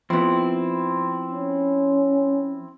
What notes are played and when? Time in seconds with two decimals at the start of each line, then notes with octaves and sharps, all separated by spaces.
0.10 F3 B3 C4 E4
1.32 C#4